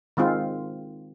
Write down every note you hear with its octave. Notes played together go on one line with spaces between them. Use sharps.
D#3 G#3 C4 F4